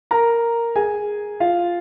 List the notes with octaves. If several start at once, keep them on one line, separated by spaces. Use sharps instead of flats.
A#4 A#5
G#4 G#5
F4 F5